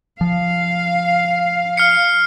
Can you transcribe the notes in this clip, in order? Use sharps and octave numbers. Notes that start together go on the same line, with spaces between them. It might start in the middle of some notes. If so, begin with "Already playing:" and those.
F3 F5
F6 C7 C#7